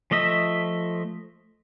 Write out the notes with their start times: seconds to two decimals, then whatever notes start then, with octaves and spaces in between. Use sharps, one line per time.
0.11 F3 A3 D#5 E5